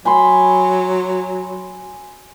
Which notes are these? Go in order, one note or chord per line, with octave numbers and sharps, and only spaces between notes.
F#3 G#5 B5 C6